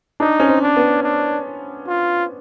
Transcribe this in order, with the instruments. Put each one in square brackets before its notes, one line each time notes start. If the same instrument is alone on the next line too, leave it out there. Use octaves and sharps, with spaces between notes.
[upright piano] D4 [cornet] D#4
[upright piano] C#4
C4
[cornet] D4
[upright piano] B3
[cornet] D4
F4